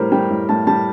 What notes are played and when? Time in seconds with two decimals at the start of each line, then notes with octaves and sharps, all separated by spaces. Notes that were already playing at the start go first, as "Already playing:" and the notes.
Already playing: A2 G3 A#4 C5
0.12 G3 G5
0.30 A2
0.49 A2 A5
0.67 G3 A5